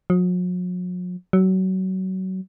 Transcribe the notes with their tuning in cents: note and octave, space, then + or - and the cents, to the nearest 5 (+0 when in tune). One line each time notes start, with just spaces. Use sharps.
F#3 -45
F#3 +25